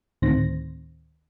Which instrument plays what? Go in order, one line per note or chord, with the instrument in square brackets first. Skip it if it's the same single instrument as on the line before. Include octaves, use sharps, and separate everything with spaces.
[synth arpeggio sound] D2 A2 D#3 C4 C5 A#6